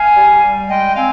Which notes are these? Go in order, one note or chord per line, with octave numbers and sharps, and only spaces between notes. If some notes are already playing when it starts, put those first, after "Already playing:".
Already playing: F5 G#5
G3
G3
G#3 D#5 G5
C4 F5 G#5